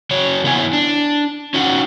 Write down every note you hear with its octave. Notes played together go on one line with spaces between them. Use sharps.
C#3 F#3 C#5
B3 E4 C#5 F#5 G#5
D4
C#4 D#4 F#4 F#5